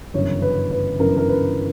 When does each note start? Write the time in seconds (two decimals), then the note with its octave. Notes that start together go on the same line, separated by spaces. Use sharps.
0.14 G1 F#2 C#3 E3 C#5
0.42 B4
0.71 B4
0.99 G1 F#2 C#3 E3 A#4
1.08 B4
1.17 A#4
1.28 B4